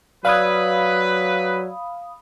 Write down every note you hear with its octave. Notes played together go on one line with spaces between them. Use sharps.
F#3 B4 D5 F5 B5 D#6 E6 G#6